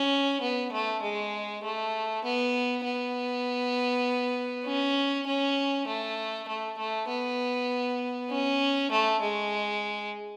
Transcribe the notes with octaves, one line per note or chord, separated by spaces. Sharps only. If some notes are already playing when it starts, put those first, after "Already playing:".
Already playing: C#4
B3
A3
G#3
A3
B3
B3
C#4
C#4
A3
A3
A3
B3
C#4
A3
G#3